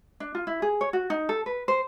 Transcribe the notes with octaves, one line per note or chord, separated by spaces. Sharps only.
D4
F4
E4
G#4
C#5
F#4
D#4
A4
B4
C5